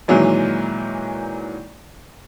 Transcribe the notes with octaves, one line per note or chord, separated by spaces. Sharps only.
A#2 D#3 E3 F#3 G#3